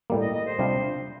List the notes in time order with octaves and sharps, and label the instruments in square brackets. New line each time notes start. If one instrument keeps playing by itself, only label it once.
[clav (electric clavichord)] A2 G3 A#3
[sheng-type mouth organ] D#5
D#5
C5
[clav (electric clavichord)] C3 G3 D4 F4